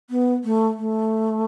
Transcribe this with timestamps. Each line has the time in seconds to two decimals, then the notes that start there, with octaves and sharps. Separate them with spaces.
0.10 B3
0.44 A3
0.78 A3